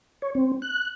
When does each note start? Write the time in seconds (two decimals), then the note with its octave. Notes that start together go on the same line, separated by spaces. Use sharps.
0.22 C#5
0.35 C4
0.62 F#6